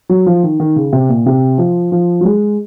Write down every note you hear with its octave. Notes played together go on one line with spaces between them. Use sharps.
F#3
F3
D#3
D#3
C#3
C3
A#2
C3
F3
F3
F#3
G#3